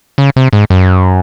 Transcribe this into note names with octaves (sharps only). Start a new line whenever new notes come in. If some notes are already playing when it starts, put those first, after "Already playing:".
C#3
C3
G#2
F#2